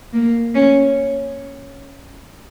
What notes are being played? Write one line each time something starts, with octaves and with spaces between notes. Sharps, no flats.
A#3
C#4